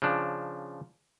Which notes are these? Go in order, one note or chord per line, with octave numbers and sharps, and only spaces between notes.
C#3 F3 D4